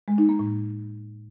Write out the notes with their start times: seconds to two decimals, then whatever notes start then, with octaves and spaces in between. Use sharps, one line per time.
0.08 G#3
0.18 D#4
0.29 A#3
0.39 A2